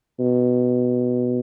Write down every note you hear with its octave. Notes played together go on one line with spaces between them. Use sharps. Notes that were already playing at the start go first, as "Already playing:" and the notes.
B2